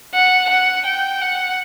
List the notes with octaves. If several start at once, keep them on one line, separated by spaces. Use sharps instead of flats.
F#5
F#5
G5
F#5